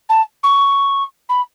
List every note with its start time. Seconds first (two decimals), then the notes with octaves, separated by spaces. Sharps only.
0.09 A5
0.43 C#6
1.29 B5